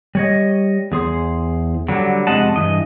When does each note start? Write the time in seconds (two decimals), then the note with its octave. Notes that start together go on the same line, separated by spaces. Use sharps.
0.15 G3 C#5 D#5
0.92 E2 G#4 C5
1.88 D3 F#3 G3
2.27 F2 C3 G#3 D#5 F#5 A5
2.56 G2 E3 D#5